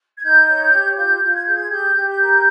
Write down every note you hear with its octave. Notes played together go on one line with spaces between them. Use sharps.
G#6
D#4 G6
C#5
G4
F4 G6
F4
G#6
G#4 G6
G#6
G4 G6
G4
G6
A#4